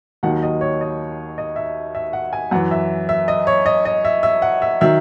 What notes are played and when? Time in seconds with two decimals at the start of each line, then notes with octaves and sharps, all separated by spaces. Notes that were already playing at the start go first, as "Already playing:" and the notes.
0.23 D#2 D#3 F#3 F#5
0.43 D#5
0.61 C#5
0.81 D#5
1.38 D#5
1.56 E5
1.95 E5
2.13 F#5
2.33 G#5
2.51 F#2 F#5
2.55 E3
2.71 E5
3.09 E5
3.28 D#5
3.47 C#5
3.66 D#5
3.85 D#5
4.05 E5
4.23 E5
4.42 F#5
4.62 E5
4.81 D#3 F#3 E5